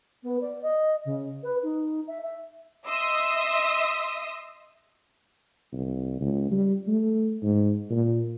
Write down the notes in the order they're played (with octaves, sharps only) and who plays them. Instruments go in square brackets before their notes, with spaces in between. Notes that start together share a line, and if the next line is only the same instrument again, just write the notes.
[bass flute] B3
D5
D#5
C#3
B4
D#4
E5
E5
[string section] D#5 E5 C6 D#6 E6
[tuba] C2
C#2
G3
A3
G#2
A#2